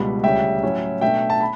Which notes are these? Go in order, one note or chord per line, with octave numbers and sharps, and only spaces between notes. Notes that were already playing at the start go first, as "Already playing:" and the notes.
Already playing: C#2 B2 G3 B5
D2 C#3 G3 C#4 E5 G5
A2 F#3 C#4 E4
B2 A3 D4 E5 G5
A5
B5